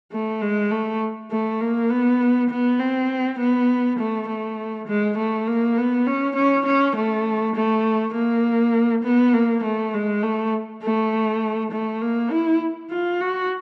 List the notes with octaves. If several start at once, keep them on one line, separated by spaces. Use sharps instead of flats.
A3
G#3
A3
A3
A#3
B3
B3
C4
B3
A3
A3
G#3
A3
A#3
B3
C#4
C#4
C#4
A3
A3
A#3
B3
A#3
A3
G#3
A3
A3
A3
A#3
E4
F4
F#4